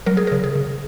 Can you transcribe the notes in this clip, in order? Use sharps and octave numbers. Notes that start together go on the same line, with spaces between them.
F#3 A#4
G#4
C#3 A#4
G#4
C#3